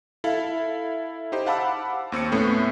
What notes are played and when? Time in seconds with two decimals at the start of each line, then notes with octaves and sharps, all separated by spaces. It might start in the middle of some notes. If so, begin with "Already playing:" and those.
0.24 E4 A4 F5
1.32 D#4 G4 C5
1.46 F5 F#5 A5 B5 D6 E6
2.12 D#2 C4 E6 C#7
2.32 A2 A3 B3 C#4